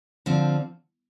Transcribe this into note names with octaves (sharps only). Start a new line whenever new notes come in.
D3 F3 C4